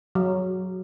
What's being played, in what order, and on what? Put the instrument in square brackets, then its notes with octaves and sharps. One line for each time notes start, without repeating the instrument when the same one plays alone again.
[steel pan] F#3